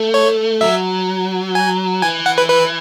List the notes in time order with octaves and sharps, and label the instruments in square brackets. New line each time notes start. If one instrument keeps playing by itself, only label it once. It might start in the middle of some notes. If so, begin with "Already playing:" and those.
Already playing: [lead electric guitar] A3
[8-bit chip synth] C#5
[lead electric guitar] F#3 [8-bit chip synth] E5
[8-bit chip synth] G#5
[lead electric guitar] E3 [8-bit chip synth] G#5
[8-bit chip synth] F#5
B4
B4